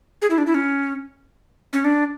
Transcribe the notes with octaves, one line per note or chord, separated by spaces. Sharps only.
G#4
E4
D4
E4
C#4
C#4
D4